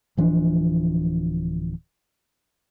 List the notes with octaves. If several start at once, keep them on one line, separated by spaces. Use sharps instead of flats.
D1 E3 F3 D4